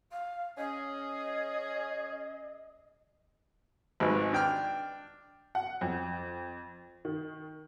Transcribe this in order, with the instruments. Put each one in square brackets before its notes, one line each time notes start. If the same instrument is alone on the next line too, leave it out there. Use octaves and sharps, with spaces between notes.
[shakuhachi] F5
[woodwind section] C#4 G#4 [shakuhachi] D#5
[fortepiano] G#1 G#2 B4
D4 G5 F6
[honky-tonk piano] F#5
F2
D#3